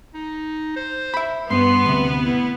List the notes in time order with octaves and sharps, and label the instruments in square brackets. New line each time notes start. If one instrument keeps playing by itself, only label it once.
[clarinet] D#4
C5
[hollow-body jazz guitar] E5 B5
[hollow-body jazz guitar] G2 [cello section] B3 [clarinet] C6
[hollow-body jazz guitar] D2 C3
[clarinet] E4